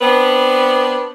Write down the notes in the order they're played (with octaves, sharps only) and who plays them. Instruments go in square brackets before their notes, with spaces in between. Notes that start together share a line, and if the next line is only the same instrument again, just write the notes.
[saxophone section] B3 C4 D4 B4